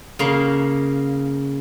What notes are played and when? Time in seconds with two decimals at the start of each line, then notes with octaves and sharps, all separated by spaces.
0.19 C#3 A#3